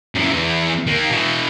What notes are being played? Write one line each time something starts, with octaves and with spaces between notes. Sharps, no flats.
F#2 E3
E2 E3
D#3 A#3
B2 E3